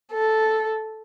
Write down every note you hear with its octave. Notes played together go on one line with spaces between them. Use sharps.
A4